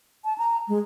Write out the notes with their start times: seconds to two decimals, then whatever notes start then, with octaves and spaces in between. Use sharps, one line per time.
0.25 A5
0.38 A#5
0.68 G#3